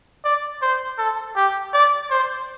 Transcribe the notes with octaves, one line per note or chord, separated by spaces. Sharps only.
D5
C5
A4
G4
D5
C5